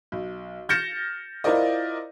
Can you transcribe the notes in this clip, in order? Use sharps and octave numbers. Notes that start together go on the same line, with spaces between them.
B1
F6 G6 A6 A#6 C#7 E7
E4 F4 A#4 C5 D5 D#5